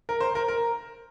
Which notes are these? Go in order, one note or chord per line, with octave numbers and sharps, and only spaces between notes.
A#4
C5
A#4
A#4